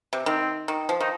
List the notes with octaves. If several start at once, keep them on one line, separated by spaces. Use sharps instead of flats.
C3
D#3 C4
D#3
F3
D#3 D#4